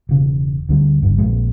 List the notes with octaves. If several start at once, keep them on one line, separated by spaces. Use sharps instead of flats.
E1 C#3
D2 D3 G3
F#1 G2
A#1 G#3